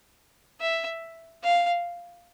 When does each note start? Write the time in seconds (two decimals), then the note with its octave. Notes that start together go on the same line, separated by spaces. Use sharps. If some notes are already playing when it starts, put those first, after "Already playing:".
0.61 E5
1.43 F5